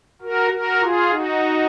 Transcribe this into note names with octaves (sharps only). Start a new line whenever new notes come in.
F#4 A#4
F#4 A#4
F4 G#4
D#4 F#4